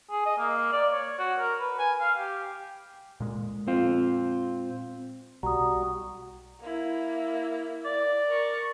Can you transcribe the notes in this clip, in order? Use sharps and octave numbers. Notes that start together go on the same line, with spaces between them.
G#4
D#5
A#3
D5
C#5
F#4
A#4
B4
G#5
F5
G4
A#2 G#3
C4 F4
B1 G3 F#4 A#5 D#6
A#3 E4
D5
A#4 C#6